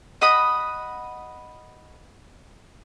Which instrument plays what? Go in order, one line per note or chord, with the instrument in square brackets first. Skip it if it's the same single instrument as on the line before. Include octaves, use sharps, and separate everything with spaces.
[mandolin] D#5 F#5 B5 D#6